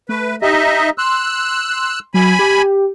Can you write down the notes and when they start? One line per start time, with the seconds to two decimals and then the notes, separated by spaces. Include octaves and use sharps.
0.09 A3 B4
0.42 D#4 G4 D#5 E5
0.98 C6 E6 F#6
2.14 F#3 G#5 B5
2.39 G4